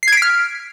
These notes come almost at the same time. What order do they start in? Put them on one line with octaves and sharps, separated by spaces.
C7 G#6 D7 B6 F6